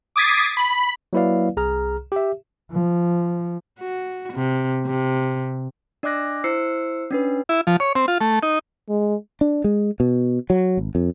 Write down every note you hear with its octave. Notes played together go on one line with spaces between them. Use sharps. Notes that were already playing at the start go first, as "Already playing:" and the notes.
D6 D#6 G#6 A6 B6 C7
B5
F#3 A#3 E4 B4 D5 F5
C2 G#4 A#5 F6
G4 E5
F3
F#4
C3
C3
D4 D5 D#5 D6 F#6 A#6
E4 C5 E6 C7 C#7
C#4 D4 B4
E4
F3
C#5
C4
F4
A3
D#4
G#3
D4
G#3
B2
F#3
G#1
F2